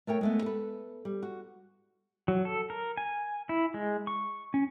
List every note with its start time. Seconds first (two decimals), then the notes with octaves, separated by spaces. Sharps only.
0.07 A3 A#4 C#5 G5
0.21 G#3 A3 B3
0.42 A4 B4
1.05 G3
1.23 F#4
2.28 F#3
2.45 A4
2.70 A#4
2.97 G#5
3.49 E4
3.74 G#3
4.07 C#6
4.54 C#4